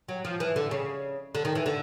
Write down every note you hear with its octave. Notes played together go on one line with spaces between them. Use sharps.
F#3
F3
E3
D3
C#3
D3
D#3
E3
D3